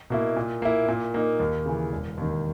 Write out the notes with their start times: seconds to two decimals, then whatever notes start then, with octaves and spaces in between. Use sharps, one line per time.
0.10 B2 A#3 E4
0.36 A#2
0.62 A#3 E4
0.88 A#2
1.14 A#3 D#4
1.40 D#2
1.66 C#3 E3
1.92 E1
2.18 D#2 D#3